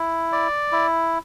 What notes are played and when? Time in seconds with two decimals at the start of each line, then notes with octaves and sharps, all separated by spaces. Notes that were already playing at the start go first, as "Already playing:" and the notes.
Already playing: E4
0.32 D5
0.72 E4